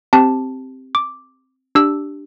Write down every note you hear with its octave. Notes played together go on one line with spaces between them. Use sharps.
C4 G4 A5
D6
D4 G4 E6